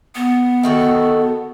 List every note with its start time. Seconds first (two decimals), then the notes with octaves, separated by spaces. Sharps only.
0.15 B3
0.63 D#3 F#4 A4